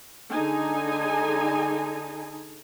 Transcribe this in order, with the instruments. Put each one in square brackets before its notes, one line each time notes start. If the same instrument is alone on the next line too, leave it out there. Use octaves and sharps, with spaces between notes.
[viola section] D3 D#4 G#4 G#5